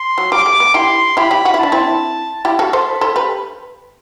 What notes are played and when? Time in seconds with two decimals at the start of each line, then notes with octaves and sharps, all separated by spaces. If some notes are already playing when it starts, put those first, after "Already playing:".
Already playing: C6
0.18 F#3
0.32 G3 D6
0.46 A3
0.60 B3
0.74 E4 G4 C6
1.17 E4 G4 B5
1.31 E4 G4
1.45 F#4
1.54 E4
1.59 D4 A5
1.72 C4 E4
2.44 E4 G4 A5
2.59 F#4 A4
2.73 A4 C5
2.87 B5
3.01 A4 C5
3.16 G4 B4